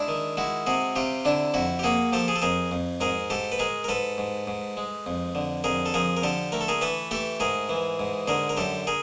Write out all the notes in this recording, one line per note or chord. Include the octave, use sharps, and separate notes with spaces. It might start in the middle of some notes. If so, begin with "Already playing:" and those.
Already playing: G#3 D4 E4
D#3
G#3 E4 F#4
C3 F#4 G#4
C3 F4 G4
D3 D4 E4
F2 E4 F#4
G4
A#3 F#4 G#4
F3 G4 A4
G#4
A4
F2 G#4 A#4
F2
G#2 G#4 A#4
G#2 G4 A4
B4
G#3 G#4 A#4
A#4
G#2 A4 B4
G#2
G#2
G#3
F2
D3
F2 G#4 A#4
A4
F3 G#4 A#4
A#4
D3 G4 A4
A3 A#4
A4
G#4 A#4
E3 A4 B4
A3 G4 A4
G#2 G#4 A#4
E3
G#2
D3 G#4 A#4
A#4
F#2 G4 A4
G#4 A#4